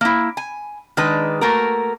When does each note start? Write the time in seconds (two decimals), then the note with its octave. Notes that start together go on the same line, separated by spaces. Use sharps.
0.01 A#3 E4
0.37 G#5
0.97 D#3 G#3 D4 B4
1.41 A3 A#3 F#4 A#4